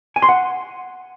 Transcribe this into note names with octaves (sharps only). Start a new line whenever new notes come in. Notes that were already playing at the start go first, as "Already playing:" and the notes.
G#5
C6
F#5